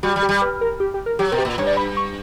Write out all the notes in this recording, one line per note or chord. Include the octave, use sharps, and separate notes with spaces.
G3 F#4
G3
G4
G3
B4
A#4
G4
G4
A#4
F#3 G4
B2 A#4
G4
A#2
G2 C#5
D5
B5
C#6